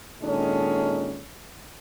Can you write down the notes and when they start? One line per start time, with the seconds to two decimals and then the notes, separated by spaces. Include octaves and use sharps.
0.22 A#2 D#3 G#3 C#4 D4 A4